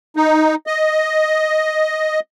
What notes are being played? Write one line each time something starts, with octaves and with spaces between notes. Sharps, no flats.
D#4
D#5